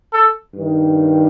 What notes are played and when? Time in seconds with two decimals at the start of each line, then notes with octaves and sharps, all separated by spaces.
0.12 A4
0.55 G2 D#3